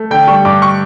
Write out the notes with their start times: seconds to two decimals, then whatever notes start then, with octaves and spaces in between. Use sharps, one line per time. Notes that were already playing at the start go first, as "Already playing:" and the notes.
Already playing: A3
0.11 D3 G5
0.28 G3 C#6
0.45 G2 D6
0.62 C#6